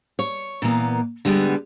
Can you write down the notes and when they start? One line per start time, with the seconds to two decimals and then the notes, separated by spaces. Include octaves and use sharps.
0.19 C#5
0.62 A#2 E3 A#3 B3
1.25 D3 G3 G#3 B3